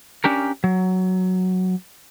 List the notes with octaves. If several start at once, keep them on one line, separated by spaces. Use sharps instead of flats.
C#4 D4 G4 A#4
F#3